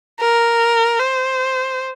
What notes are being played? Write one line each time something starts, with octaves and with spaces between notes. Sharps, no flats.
A#4
C5